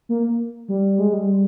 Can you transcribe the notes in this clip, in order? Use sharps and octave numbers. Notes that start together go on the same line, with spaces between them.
A#3
G3
G#3
G3